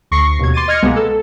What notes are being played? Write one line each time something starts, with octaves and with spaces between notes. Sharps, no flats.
D2 C#6 A#6 C7
D#2 B2 G#6
C6 D6 A6 D#7
D#5 F6 G#6 A#6 C#7
C2 B2 G#3 A#3 B3
A4